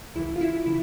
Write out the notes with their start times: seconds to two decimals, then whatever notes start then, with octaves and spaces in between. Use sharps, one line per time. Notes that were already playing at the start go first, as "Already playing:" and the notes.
0.16 C#2 C#3 E3 E4
0.36 F4
0.41 E4
0.66 C#3 E3 E4